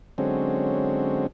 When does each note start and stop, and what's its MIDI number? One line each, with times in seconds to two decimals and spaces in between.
0.18 1.27 50
0.18 1.27 54
0.18 1.27 56
0.18 1.27 60
0.18 1.27 61